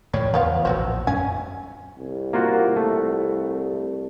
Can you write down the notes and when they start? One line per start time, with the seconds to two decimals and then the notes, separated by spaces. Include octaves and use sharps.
0.13 A2 C#3 F3 G3 C#5 D5
0.34 E2 F3 B3 F4
0.65 A#1 A2 F#3 F#4 C5
1.07 F#2 C#4 G#5
1.99 C2
2.33 A#3 F4 F#4
2.76 A3